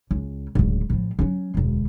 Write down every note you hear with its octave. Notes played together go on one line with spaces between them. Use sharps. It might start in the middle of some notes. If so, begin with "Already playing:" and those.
C#2
D1 C#2
A2 F3
F#3 C#4
E1 D2